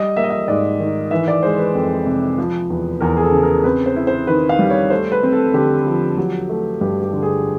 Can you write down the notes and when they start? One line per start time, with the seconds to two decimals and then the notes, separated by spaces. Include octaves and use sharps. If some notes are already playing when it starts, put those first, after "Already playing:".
Already playing: G3 D#5
0.17 A#3 E5
0.24 D#5
0.31 E5
0.48 G#2 D5
0.80 D#3
1.11 E3 E5
1.28 D5
1.43 G#3 C5
1.59 B4
1.75 F2
2.06 C3
2.38 F3
2.70 E2
3.01 E2 A#4
3.17 G#4
3.23 A4
3.32 C#3
3.43 A#4
3.64 C4 B4
3.86 C5
3.96 E4
4.07 C5
4.27 D#3 B4
4.49 F5
4.59 G3
4.70 C#5
4.90 A3 C5
5.12 B4
5.23 C4
5.33 A4
5.54 D3 G4
5.86 F3
6.17 F#3
6.49 A3
6.81 G2 G4
7.02 G4
7.13 D3
7.22 G#4